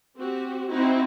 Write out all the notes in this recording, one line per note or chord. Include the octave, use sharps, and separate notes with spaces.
C4 F#4 G4
C4 D#4 E4 F#4